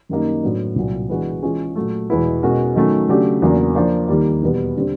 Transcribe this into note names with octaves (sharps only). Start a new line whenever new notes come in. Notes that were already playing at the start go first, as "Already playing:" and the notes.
F#2 D#3 G3 A#3 D#4
A2 F#3 B3 D4
C2 A#2 F#3
E3 G#3 B3 D4 F#4
E3 G#3 C#4 F4 G#4
A#2 F#3 A3
E2 B2 G#3 B3 E4
B2 G#3 C#4 F#4 A#4
D#3 F#3 A3 C#4
C#3 F#3 A3 D4 G4
E2 C#3 F#3 A#3 D4
F3 A#3 D4 F4
D#2 D#3 G3 A#3
E2 B2 G3 B3
D3 G3 C4